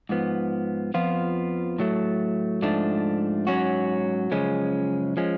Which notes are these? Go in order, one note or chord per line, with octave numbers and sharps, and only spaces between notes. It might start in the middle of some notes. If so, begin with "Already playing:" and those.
G#2 F3 B3
F2 F3 B3 F4
A2 F#3 A3
G#2 F3 A3 D4
G#2 F#3 C#4 F#4
F#2 C#3 F3 G#3 C#4
F3 G#3 C#4